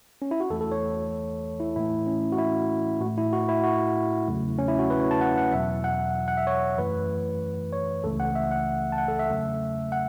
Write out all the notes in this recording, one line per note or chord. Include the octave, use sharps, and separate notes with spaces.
C#4
E4
F#4
E2 E3 A3 A4
A4
C#5
E4
A2 E3 A3 E4
C#4
F#4
E4
A2 A3 F#4
E4
F#4
E4
F#4
E2 C#3 F#3 A3
C#4
E4
F#4
B4
C#5
A5
F#5
F#5
E2 B2 F#3 E5
F#5
F#5
E5
C#5
F#2 E3 A3 B4
C#5
C#2 C#3 E3 A3 A4
F#5
E5
F#5
A5
F#5
A4
E5
E2 C#3 F#3 A3
F#5